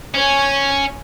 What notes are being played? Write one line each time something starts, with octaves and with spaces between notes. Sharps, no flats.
C#4 C#5 G#5